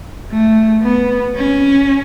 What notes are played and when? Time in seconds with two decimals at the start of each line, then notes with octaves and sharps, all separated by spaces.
0.30 A3
0.83 B3
1.35 C#4